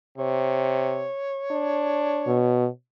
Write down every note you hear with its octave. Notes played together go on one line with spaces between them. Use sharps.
C3 C#5
D4
B2